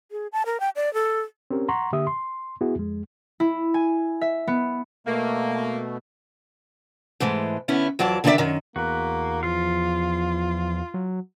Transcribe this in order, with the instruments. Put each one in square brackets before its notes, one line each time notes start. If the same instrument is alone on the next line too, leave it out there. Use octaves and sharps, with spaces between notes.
[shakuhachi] G#4
A5
A#4
G5
D5
A4
[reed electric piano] C4 C#4 G4 A#4 C#5
F#5 A#5 C6 C#6
D3 A#3 G4 E5 D#6
C6
B3 E4 F#4 G#4
F2 G#3
[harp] E4
G#5
E5
B3
[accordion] B2 A3 [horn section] A#3
[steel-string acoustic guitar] G#2 E3 G#3 A3
D3 B3 C#4 E4
F2 E3 F#3 D5 A5
D3 D#3 D4 A4 D5 E5
F#2 D#3
[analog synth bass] E2 [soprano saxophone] A#3 [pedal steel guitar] F#4 B4
[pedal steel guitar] F3 F5 [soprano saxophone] F4
[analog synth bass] F#3